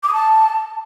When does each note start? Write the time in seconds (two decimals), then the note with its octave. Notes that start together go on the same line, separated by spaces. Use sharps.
0.03 D6
0.08 D#6
0.13 A5